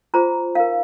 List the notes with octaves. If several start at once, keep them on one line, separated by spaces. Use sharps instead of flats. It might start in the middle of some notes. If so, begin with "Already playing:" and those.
F4 G#4 C5 A#5
D#4 A#4 F5